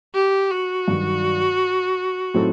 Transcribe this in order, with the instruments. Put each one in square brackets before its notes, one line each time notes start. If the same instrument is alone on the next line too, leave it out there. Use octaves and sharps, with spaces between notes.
[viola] G4
F#4
[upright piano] G2 D#3 F#3
A2 F#3 C4 D#4 A4